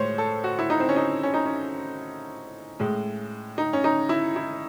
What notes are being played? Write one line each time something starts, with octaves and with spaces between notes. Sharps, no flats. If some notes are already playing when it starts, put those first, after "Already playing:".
Already playing: A2 G#3 C5 C#5
A4
F#4
E4
D#4
C4
C#4
D#4
C#4
D#4
C#4
A2 G#3
D#4
C#4
D#4
E4
E4